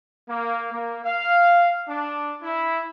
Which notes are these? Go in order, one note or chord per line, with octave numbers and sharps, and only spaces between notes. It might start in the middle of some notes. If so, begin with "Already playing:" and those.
A#3
A#3
F5
D4
E4